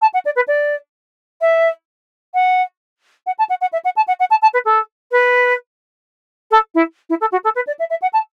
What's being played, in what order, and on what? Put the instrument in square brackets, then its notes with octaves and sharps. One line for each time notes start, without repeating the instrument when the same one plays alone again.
[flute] A5
F#5
D5
B4
D5
E5
F#5
F#5
A5
F#5
F#5
E5
F#5
A5
F#5
F#5
A5
A5
B4
A4
B4
A4
E4
E4
A4
F#4
A4
B4
D5
E5
E5
F#5
A5